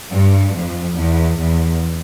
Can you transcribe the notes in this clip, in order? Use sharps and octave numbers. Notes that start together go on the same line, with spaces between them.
G2
F2
E2
E2